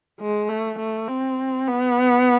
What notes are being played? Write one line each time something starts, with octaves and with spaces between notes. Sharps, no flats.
G#3
A3
A3
C4
B3